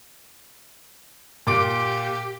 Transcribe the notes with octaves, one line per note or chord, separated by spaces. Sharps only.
A#2 G4 D6 D7